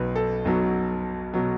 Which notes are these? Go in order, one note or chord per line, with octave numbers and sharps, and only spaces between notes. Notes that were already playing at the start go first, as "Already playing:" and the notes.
Already playing: B1 B2 F#3 B4
A4
B1 B2 F#3
B2 F#3